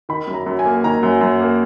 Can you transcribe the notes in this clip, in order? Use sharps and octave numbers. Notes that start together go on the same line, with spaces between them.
D#3 B5
F#2
A#5
F#2
G#5
A#3
D#3 A#5
F#2
F#2
A#3